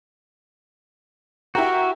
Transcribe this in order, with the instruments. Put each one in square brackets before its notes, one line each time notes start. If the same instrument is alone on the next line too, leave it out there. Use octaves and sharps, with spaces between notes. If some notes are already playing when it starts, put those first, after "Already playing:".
[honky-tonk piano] E4 G4 A#4 [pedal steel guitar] F#4